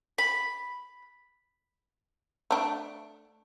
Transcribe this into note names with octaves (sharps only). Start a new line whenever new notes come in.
B5
A3 D4